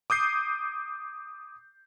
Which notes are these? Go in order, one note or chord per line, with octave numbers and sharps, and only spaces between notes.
D6 D#6 G6 C7